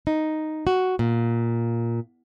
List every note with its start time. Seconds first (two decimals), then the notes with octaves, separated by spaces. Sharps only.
0.07 D#4
0.67 F#4
0.99 A#2